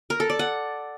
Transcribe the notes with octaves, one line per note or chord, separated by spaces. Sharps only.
A#4
A4
D5
F#5